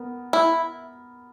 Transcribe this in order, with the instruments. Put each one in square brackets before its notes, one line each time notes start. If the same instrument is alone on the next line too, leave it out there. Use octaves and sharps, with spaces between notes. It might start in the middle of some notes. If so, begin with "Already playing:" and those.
Already playing: [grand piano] B3 A#4
[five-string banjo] E4